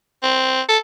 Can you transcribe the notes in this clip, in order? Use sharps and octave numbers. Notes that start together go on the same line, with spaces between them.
C4
A4